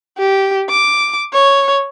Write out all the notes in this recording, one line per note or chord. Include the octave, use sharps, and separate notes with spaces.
G4
D6
C#5